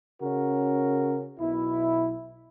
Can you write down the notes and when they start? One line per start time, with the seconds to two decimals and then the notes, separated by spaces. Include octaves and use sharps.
0.22 C#3 C#4 F#4 A#4
1.39 B1 B2 E4